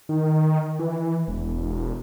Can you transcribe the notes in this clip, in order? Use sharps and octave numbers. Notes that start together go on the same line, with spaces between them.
D#3
E3
E1